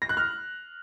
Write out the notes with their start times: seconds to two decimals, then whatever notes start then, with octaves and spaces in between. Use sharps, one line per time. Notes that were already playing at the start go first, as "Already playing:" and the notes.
0.02 A#6
0.09 F#6
0.17 F6